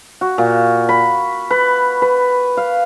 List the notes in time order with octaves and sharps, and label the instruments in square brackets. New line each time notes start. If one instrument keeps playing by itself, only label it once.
[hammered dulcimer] F#4
A#2
B5
B4
B4
F5